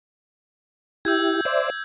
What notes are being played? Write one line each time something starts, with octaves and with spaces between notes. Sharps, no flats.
E4 G4 E6 G6 G#6
C5 D5 E5